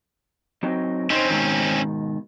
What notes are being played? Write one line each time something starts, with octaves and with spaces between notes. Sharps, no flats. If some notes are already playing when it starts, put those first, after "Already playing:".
F#3 C4 D#4
C4 C#4 D#4 C5
G#2 B2 D#3